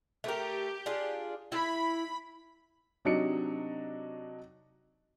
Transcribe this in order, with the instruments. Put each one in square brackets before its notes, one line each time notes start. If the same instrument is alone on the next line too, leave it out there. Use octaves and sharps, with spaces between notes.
[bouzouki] A3 A#4 [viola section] G4
[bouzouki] D4 F4 G#4
[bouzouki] E4 [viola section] B5
[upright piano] C3 F#3 D4 D#4 C#7